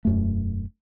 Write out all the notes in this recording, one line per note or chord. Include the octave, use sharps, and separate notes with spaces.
E1 F#2 A3